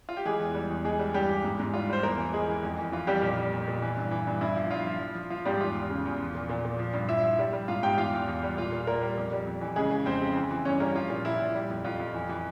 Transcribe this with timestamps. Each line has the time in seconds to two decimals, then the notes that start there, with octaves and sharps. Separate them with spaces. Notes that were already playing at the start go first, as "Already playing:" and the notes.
0.09 F4
0.17 G4
0.25 E3 G#3 G#4
0.40 E2
0.55 G3
0.70 E2
0.85 E3 G#3 G#4
0.99 G3
1.14 G2 G3 G4
1.29 E3
1.44 G#2
1.59 G#2
1.74 G3 F4
1.89 G3 C5
2.03 E2 A#3 A#4
2.18 E3
2.33 E3 G#3 G#4
2.49 E3
2.63 F2
2.78 E3
2.92 E3 F4
3.07 F2 G3 G4
3.22 A#2
3.38 G3
3.52 A#2
3.68 A#2
3.82 E3
3.97 G2
4.11 E3
4.27 G2
4.41 G2 E4
4.56 F3
4.71 G2 F4
4.87 F3
5.01 F3
5.15 F3
5.30 F3 F4
5.45 G#2 G3 G4
5.60 E2 F4
5.75 E2
5.89 C#3
6.05 E2
6.20 F3
6.35 A#2
6.49 A#2
6.65 A#2
6.79 F3
6.93 G2
7.09 F3 E4 E5
7.24 F3
7.39 G3
7.53 G3
7.68 G#2 F4 F5
7.83 G#2 G4 G5
7.97 E2 F4 F5
8.13 E2
8.28 E2
8.43 G3
8.57 A#2 F4 F5
8.72 A#2
8.87 A#2 A#3 A#4
9.02 G3
9.17 F2
9.32 G3
9.47 F2
9.61 E3
9.76 C#3 G#3 G#4
9.91 C#3
10.06 F2 C4 C5
10.21 C#3
10.36 E3
10.51 E3
10.65 G2 C#4 C#5
10.80 G3 A#3 A#4
10.95 F3 F4
11.10 A#2
11.25 A#2 E4
11.40 A#2
11.55 G3
11.70 F2
11.84 F2 F4
11.99 F2
12.14 E3
12.29 E3